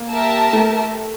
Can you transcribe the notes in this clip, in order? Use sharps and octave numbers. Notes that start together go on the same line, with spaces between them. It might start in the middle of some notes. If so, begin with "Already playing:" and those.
Already playing: A#3
G4 A#4 E5 A5
A3